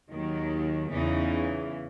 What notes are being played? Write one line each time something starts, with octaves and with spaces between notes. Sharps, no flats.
D#2 D#3 F#3
E2 C#3 E3 D#4